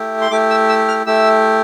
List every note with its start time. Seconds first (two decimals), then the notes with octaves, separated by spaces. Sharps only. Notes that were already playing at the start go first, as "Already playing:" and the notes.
Already playing: A3 E4 G4
0.21 C6
0.31 A3 E4 G4 D6
0.50 E6
0.69 E6
0.88 F6
1.06 A3 E4 G4 E6